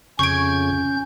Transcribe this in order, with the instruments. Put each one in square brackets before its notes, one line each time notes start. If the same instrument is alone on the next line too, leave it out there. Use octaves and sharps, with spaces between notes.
[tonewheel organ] F2 C#3 G#6 [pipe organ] C#4 G6 [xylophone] C#6 D7